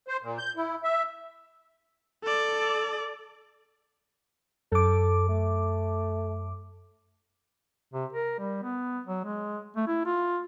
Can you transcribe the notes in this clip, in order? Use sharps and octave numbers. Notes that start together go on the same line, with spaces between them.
C5
A#2
G6
E4
E5
A4 D5
F#2 A4 D6
A3
C3
A#4
G3
B3
F#3
G#3
A3
E4
F4